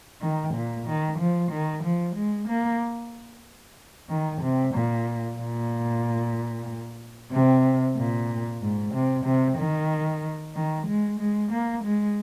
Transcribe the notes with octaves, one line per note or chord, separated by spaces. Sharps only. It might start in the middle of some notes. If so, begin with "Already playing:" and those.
D#3
A#2
D#3
F3
D#3
F3
G#3
A#3
D#3
C3
A#2
A#2
C3
A#2
G#2
C3
C3
D#3
D#3
G#3
G#3
A#3
G#3